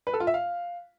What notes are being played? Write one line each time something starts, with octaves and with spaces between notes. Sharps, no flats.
B4
A4
F4
E5
F5